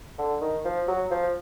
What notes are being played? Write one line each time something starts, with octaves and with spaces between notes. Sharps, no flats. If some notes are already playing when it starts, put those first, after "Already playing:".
D3
D#3
F3
F#3
F3